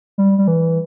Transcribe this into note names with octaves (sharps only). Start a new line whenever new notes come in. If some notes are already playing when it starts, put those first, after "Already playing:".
G3
G3
E3